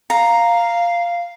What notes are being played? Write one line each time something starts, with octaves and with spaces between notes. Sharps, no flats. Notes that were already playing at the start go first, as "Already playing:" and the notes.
F5 A#5